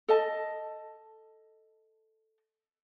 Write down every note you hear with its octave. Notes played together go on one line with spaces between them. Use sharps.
A4 D#5 A5